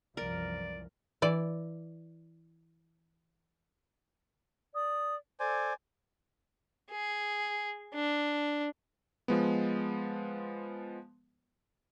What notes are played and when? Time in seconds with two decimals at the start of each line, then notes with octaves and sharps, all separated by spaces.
0.17 C2 F#2 E3 F3 A#4 D5
1.22 E3 D5
4.74 D5 D#6
5.40 A4 C5 D5 G#5
6.91 G#4
7.95 D4
9.28 F3 G#3 B3